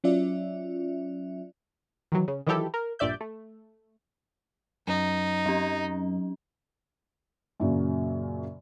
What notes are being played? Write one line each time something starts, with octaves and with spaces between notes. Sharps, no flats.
F#3 C#4 F4 D5 E5
D#3 E3 F#3
C#3
D#3 E3 F#3 E4 G4 A4
A#4
A#1 G2 D5 E5 G6
A3
F#2 D#4
F#3 C#4
F#2 A#2 C#3 F#3